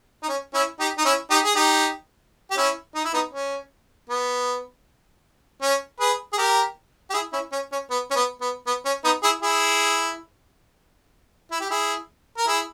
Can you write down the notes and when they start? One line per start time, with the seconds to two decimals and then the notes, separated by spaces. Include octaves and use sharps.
0.23 D#4
0.29 C#4
0.54 C#4 E4
0.80 D#4 G4
0.98 D#4
1.05 C#4 E4
1.30 D#4 G4
1.44 G#4
1.56 D#4 G4
2.51 G4
2.57 C#4 E4
2.95 D#4
3.05 E4
3.14 B3 D#4
3.33 C#4
4.10 B3
5.62 C#4
6.00 G#4 B4
6.33 G#4
6.38 G4 A#4
7.10 G4
7.14 E4 G#4
7.33 C#4 E4
7.52 C#4
7.72 C#4
7.90 B3
8.11 C#4
8.16 B3
8.41 B3
8.67 B3
8.85 C#4
9.05 B3 D#4
9.23 E4 G#4
9.43 E4 G#4
11.51 E4
11.60 G4
11.71 E4 G#4
12.37 A#4
12.48 E4 G#4